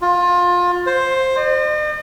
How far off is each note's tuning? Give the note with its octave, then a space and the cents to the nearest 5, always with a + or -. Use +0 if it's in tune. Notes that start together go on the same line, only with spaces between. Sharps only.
F4 +25
C5 +10
D#5 -45